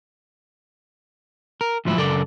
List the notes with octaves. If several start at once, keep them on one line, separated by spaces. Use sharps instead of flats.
A#4
D2 G#2 F3 F#3 E4
F#2 C#3 A4 A#4 D5